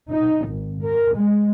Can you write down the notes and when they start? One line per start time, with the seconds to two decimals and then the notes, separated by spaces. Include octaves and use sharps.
0.11 D#4
0.48 G#1
0.83 A#4
1.16 G#3